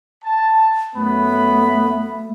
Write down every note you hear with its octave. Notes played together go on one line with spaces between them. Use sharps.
A5
F#2 A3 B3 B5